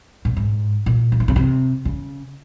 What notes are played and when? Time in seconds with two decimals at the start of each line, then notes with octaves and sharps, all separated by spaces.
0.25 A#2
0.37 G#2
0.86 A#2
1.12 F3
1.20 E3
1.28 C#3
1.36 C3
1.85 C#3